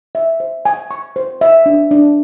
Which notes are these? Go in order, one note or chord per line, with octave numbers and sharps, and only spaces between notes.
E5
C5
G#5
C#6
C5
E5
D4
D4